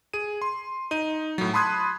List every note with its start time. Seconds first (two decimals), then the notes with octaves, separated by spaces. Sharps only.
0.13 G#4 D#7
0.42 C6
0.91 D#4 D#7
1.38 A2 F#3
1.53 A5 B5 C6 D#6 F#6 G#6